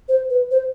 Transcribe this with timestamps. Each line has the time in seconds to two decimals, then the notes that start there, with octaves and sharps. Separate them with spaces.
0.09 C5
0.30 B4
0.51 C5